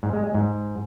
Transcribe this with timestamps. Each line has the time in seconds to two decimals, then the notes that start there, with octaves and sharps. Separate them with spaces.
0.03 G#2
0.13 G#3
0.24 G#3
0.34 G#2